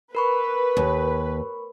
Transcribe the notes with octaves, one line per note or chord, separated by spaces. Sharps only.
A#4 B4 B5 C#6
D#2